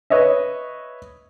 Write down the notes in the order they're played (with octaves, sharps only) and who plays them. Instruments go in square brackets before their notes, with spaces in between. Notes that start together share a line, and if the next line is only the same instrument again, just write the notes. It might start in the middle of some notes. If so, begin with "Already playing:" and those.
[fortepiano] B4 C#5 D#5 E5